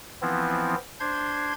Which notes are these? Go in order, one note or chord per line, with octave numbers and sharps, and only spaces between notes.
E3 F3 B3 C4 E4
D4 C5 C6 G#6